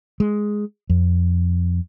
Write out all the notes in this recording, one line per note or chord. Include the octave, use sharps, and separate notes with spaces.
G#3
F2